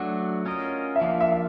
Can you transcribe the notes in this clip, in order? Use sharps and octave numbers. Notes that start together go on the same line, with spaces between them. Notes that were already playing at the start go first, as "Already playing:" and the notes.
Already playing: F#3 A3 D4 F#4 F#5
C#4 F4 A#4 D#5
E5
F3 A#3 D4 F5
E5
E5